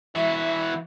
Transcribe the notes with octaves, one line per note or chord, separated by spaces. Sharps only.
E3 E4 F#4 E5